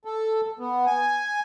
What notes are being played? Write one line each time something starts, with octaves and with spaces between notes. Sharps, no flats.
A4
B3
G#5